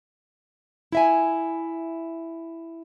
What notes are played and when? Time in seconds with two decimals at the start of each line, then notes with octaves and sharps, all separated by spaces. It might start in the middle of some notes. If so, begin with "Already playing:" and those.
0.92 E4 E5 G#5